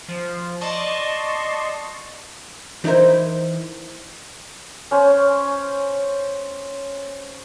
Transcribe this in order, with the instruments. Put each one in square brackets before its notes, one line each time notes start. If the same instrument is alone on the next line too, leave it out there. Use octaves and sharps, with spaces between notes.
[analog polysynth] F3
D5 D#5 A5 C6 C#6
[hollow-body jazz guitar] E3 D#4 E4 A#4 C5
[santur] C#4 C5